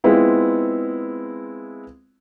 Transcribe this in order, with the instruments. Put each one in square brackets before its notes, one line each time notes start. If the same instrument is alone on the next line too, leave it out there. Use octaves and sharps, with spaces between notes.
[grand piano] G#3 B3 C4 E4 F4